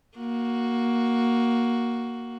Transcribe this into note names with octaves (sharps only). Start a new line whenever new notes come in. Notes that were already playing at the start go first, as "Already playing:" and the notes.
A#3 F#4